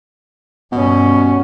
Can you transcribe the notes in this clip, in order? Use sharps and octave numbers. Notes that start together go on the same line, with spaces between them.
G2 B2 C#4